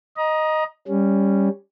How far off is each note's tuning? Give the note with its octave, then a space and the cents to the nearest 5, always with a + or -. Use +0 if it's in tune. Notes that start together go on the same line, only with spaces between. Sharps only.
D#5 +0 A#5 +25
G3 +10 C#4 +0